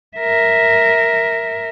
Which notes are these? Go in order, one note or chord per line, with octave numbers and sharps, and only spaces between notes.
A#4 E5